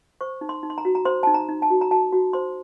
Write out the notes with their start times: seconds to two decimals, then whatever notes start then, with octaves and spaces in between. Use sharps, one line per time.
0.21 C5 C#6
0.41 D#4
0.49 C6
0.63 D#4
0.70 C6
0.78 A#5
0.85 F#4
0.95 A#5
1.05 C5 C6
1.23 D#4 A5
1.34 A#5
1.49 D#4
1.62 A5
1.70 F#4
1.81 A#5
1.91 F#4 A5
2.13 F#4
2.33 C5 C6